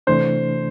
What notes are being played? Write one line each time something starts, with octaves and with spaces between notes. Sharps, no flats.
C3 E3 A3 D4 C5